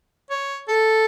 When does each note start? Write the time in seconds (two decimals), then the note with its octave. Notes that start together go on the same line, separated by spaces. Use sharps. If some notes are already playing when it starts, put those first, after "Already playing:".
0.30 C#5
0.68 A4